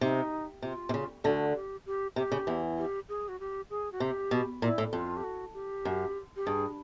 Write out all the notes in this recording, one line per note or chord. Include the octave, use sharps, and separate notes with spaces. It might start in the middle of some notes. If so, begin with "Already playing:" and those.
C3 D#4
C3 F4
C3
C#3
D2 D3 F#4
G4
G4
C3 G4
C#3
E2 E3
G4
G#4
F#4
G4
G#4
F#4
C3 G4
B2
A#2 E4
A2
F2 F4
G4
F#4
G4
F#2
G4
G2 G#4